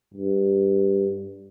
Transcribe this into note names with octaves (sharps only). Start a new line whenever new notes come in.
G2